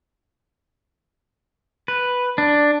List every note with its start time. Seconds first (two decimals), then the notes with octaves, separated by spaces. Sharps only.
1.88 B4
2.38 D4